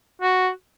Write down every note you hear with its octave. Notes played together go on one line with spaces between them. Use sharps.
F#4